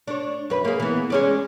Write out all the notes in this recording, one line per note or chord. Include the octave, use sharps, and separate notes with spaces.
D4 C#5
F#2 B4
A#3 G#4
E3 B3
G#3 C#4 D5